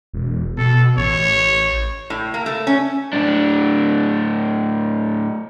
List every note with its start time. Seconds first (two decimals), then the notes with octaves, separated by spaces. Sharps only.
0.13 E1
0.57 B2 A4
0.97 A1 C#5
2.10 A2
2.34 A#3
2.46 A3
2.67 C#4
3.13 A2 D4